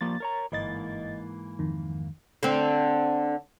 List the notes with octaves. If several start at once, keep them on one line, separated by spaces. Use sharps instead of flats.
F3 G3 A#3 A6
A#4 C#5 A#5
G1 G#2 E3 A#3 D#5 A6
F2 D#3
D3 C4